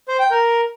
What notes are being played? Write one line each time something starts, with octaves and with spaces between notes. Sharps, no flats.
C5
G5
A#4